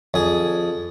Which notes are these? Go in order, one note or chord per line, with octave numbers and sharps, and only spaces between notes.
F2 G#4